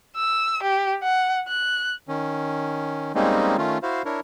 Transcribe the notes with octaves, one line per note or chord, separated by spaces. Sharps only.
E6
G4
F#5
F#6
D#3 C#4
G3 G#3 A#3 C4 C#4 D#4
D#3 A3 C#4 F4
E4 F#4 C5 F5
D4 E4 A#4 C#5